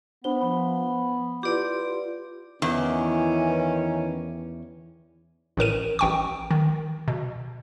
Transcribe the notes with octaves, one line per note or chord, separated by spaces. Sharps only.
B3 D4 C5 G7
F3 B5
E4 F4 G4 B4 D5 D6
E2 D#3 E3 C#4
A1 A2 A#4 D#7
A1 G5 C#6
D#3
B2